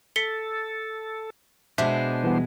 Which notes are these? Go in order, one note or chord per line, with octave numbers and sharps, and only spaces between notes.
A4 B6 C#7 G7
B2 G#3 D4 C5 E5
E3 G3 B3